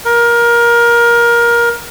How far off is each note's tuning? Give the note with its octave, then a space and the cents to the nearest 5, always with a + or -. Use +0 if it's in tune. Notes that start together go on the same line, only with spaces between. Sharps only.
A#4 +20